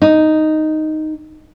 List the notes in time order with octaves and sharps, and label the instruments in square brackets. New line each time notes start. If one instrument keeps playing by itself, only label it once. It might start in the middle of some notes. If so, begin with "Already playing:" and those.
[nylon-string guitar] D#4